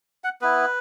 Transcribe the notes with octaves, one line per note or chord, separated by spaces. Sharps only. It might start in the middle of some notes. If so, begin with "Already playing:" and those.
F#5
B3 E4 B4